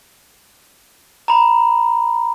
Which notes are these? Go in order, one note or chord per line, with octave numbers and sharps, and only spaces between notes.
A#5 B5